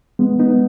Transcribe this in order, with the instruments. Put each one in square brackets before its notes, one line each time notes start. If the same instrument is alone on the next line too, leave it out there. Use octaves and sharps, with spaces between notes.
[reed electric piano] G#3 B3
B3 D#4